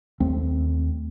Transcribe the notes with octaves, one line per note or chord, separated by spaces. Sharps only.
D#2 A3 C4